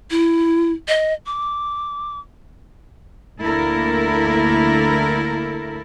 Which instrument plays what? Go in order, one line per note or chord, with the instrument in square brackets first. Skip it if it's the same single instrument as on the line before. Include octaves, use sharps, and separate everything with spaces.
[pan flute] E4
D#5
D6
[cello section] D2 D3 A#3 E4 A4 A#4